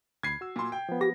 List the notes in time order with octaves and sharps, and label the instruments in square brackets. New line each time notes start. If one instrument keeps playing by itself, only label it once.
[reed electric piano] D2 B5 [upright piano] G#6 C7
[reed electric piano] F#4 E6
[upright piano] A#2 C6
G5
[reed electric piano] F3 B3
[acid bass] G4 [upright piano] A#6